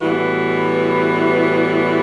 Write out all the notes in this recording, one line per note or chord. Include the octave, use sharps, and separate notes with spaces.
A2 E3 G3 B3 F#4